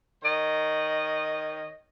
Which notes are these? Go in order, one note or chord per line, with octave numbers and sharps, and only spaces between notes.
D#3 C#5 D#5